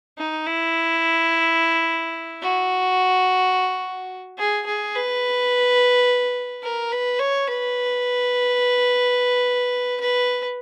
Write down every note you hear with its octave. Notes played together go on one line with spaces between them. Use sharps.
D#4
E4
F#4
G#4
G#4
B4
A#4
B4
C#5
B4
B4